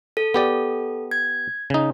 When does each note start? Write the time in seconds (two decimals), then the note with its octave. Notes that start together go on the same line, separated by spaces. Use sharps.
0.17 A4
0.34 B3 G4 A4 D5
1.11 G#6
1.70 C#3 D#4